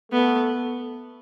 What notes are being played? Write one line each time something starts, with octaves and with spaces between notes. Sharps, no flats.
A3 B3